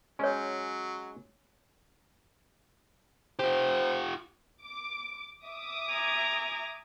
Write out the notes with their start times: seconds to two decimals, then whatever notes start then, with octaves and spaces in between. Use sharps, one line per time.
0.19 F#3 G#3 C#4 C#5 G#5
3.39 F4 G4 C5
4.62 D6
5.45 E5 D6 D#6
5.91 G#5 A#5